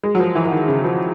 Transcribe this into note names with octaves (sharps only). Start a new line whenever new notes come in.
G#3
F#3
F3
E3
E3
D#3
C#3
F3